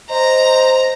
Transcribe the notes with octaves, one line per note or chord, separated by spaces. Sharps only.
C5 D#5 A#5